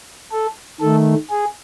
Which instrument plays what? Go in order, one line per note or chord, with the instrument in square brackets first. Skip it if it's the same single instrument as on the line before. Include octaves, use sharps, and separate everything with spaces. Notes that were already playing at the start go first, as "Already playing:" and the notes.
[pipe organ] A4
D#3 A3 A4
G#4